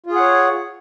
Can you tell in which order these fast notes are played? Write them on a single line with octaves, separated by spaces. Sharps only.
F4 G#4 F#5 C#5